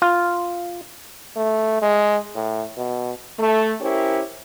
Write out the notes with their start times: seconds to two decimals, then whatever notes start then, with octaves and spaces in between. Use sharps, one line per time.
0.02 F4
1.36 A3
1.82 G#3
2.35 A2
2.77 B2
3.39 A3
3.81 C#4 E4 G4 A#4 C5 C#5